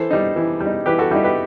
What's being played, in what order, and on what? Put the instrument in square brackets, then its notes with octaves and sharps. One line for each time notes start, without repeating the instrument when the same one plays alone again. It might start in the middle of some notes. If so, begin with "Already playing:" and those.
Already playing: [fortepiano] E3 A4 C5
G3 D#4
E3
G3
D#4
E3 G4 B4
F#4 A4
G3 D#4 E4 G4
G4 B4